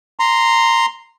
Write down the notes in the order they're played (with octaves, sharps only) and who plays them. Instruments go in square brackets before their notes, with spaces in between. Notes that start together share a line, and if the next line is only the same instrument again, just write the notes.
[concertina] A#5 C6